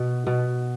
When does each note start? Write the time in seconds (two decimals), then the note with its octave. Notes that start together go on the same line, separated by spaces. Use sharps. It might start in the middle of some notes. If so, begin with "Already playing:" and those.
Already playing: B2
0.27 B2